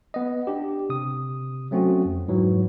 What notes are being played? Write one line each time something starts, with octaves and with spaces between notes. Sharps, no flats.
B3 D#5
D4 G4
C3 D#6
F#3 A3 C4 C#4 F#4
F2
G#2 E3 F#3